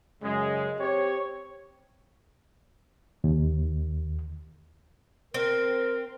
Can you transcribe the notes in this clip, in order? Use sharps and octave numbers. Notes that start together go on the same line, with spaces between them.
F#2 C#3 G#3
C4 G4 C#5
D#2
C4 A#4